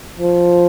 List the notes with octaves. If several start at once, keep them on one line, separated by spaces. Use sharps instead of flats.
F3